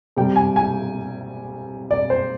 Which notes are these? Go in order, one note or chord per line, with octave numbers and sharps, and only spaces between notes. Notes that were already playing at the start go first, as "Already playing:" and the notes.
C3 G3 G5
G#5
G#5
D5
C5